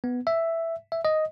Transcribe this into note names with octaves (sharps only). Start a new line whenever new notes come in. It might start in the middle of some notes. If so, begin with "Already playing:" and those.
B3
E5
E5
D#5